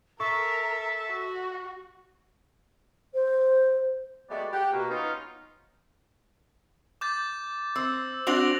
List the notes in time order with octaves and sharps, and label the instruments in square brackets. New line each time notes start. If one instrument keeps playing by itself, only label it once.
[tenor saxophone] A4 [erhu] A#4 [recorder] E5 [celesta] C#6
[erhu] F#4
[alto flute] C5
[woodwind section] G#3 A3 B3 F#4 G4 D5
G4 F#5
B2 A#3
B3 C#4 D#4 F4
[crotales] D6 G6 A6
[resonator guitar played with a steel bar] C4 [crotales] E6
[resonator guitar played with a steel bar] C4 D4 F#4 [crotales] A#6 F7 F#7